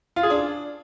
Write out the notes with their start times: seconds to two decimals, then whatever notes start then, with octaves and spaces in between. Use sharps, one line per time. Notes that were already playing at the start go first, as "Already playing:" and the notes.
0.16 F4
0.23 G#4
0.30 D4